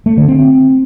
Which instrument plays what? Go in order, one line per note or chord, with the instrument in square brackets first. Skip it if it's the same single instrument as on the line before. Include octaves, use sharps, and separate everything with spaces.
[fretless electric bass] A3
D3
C4